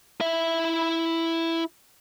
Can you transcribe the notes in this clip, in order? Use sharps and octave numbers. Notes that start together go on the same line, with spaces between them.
E4 E5